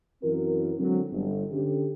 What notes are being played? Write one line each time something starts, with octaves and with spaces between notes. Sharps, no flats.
F#2 E3 C4 F#4 A#4
D3 F#3 G#3 C4
G1
D3 C#4 G4